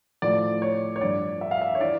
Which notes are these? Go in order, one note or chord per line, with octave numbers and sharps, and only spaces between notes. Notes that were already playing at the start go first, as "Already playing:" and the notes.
A2 F3 D5
C#5
C#5
G2 F3 D5
E5
F5
E5
C#5
E3 D5